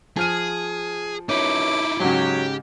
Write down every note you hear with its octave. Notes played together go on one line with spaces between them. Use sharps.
F3 G#4 F6 D#7
F#2 E3 D#4 E4 C#5 D6
G#2 C#3 F#3 G4